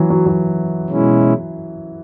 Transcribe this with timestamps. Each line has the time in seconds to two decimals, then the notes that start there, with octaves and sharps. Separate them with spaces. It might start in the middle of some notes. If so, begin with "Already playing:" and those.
Already playing: E3 F#3
0.10 F#3
0.26 F#3
0.89 B2 G#3 C#4 E4